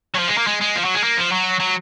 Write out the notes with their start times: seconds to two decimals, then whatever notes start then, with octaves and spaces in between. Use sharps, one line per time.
0.15 F#3
0.18 F3
0.28 G#3
0.37 A#3
0.47 G#3
0.61 G#3
0.75 F3
0.85 F#3
0.94 G#3
1.03 A#3
1.17 F3
1.32 F#3
1.60 F#3